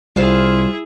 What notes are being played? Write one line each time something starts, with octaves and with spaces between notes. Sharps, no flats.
C2 G3 E4 F4 G#4 C5 F5